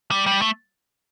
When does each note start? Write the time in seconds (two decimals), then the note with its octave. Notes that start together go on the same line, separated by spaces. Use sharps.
0.11 G3
0.26 G3
0.42 A3